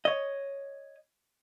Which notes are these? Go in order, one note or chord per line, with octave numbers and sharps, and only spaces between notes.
C#5 D#5